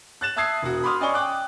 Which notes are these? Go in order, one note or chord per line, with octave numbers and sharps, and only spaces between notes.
F#6 A6 E7
E5 A5 D#6 E6 G#6 C7
E1 F#4
B5 C6 D6 D#6 F6
C#4 D5 D#5 G#5 C#6 G7
G5 D6 F#6